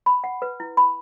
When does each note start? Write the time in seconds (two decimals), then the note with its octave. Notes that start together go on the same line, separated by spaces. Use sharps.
0.06 B5
0.24 F#5
0.42 B4
0.60 E4
0.77 B5